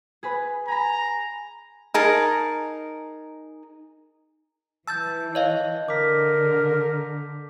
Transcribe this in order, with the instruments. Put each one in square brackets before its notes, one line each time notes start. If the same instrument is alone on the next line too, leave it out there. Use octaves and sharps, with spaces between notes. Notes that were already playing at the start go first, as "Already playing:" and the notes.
[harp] G#4 B4 B5
[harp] G#5 B5 [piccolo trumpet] A#5
[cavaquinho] D#4 G#4 A#4 A5
[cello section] E3 [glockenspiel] A5 G6 [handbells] E6 A6
[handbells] C#5 D#5 F5
[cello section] D3 [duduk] A#4 [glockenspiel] D6 B6